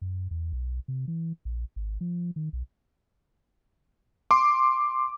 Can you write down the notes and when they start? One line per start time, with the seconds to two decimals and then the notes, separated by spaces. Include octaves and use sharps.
0.01 F#2
0.31 E2
0.52 B1
0.88 C3
1.08 E3
1.45 A#1
1.76 G#1
2.01 F3
2.36 D#3
2.53 B1
4.31 C6 D6